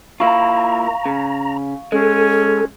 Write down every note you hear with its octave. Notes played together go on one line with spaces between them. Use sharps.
A#3 E4 F4 F5 A#5 C#6
C#3
G#3 C#4 A4